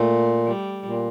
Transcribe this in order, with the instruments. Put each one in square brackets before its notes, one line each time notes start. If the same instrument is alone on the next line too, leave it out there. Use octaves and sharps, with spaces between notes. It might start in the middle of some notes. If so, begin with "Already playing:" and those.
Already playing: [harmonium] A#2 [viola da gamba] A3
[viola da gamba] G3
[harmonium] A#2